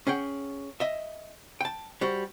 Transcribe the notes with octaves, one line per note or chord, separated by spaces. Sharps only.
C#4 G#4 F#5 G5
D#5 E5
G5 A5
G3 F#4 C5